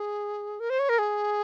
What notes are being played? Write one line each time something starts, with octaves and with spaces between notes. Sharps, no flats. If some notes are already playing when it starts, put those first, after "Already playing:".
Already playing: G#4
A#4
C5
C#5
A#4
G#4